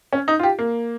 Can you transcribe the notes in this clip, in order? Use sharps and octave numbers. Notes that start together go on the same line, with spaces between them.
C#4
D#4
F4
G4
A#3